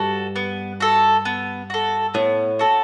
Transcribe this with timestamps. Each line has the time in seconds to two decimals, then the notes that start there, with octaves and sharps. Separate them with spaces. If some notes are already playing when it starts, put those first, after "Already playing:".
Already playing: G2 G3 F#4 A4
0.36 B3
0.80 F#4 A4
1.25 B3
1.70 F#4 A4
2.14 A2 B3
2.59 F#4 A4